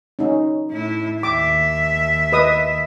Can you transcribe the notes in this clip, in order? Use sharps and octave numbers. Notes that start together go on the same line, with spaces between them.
C#4 D#4
A2 E4
D#2 E5 D6
B4 D#5 D#6